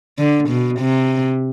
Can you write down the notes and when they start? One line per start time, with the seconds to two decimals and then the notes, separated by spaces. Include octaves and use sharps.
0.19 D3
0.49 B2
0.80 C3